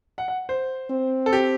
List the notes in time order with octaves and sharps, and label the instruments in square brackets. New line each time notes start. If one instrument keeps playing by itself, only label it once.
[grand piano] F#5
F#5
C5
[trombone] C4
[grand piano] A4
G4